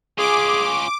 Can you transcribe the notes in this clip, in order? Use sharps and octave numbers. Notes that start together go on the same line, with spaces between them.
C#4 F4 G#4 D6